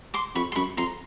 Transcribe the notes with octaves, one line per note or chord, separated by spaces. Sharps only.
C6 D6
F2 B5 C#6
C6
F#2 B5 C#6
F2 A#5 C6